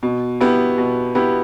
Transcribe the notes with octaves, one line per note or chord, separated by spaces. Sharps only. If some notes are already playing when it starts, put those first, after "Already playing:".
B2
B3 E4 G4
B2
B3 E4 G4